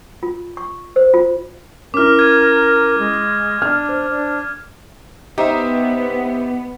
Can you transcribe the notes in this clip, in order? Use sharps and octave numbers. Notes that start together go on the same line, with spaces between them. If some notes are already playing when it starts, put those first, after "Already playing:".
F4
C#6
C5
F4
C#4 E4 A#4 D6 F6
G#6 D#7
G#3
D4 F6
C5
D4
B3 D#4 G4 C5 E5